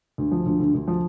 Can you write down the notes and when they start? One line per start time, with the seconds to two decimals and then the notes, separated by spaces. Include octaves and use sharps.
0.18 D2
0.31 F3
0.46 D2
0.60 D3
0.74 D2
0.88 F3